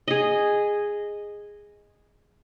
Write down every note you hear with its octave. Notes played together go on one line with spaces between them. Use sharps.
G#4 D#5